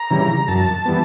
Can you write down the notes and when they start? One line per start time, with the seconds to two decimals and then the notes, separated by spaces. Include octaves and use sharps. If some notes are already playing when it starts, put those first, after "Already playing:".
Already playing: A#5
0.11 C#3 E3 G3
0.48 F#2 A5
0.86 E3 G3 B3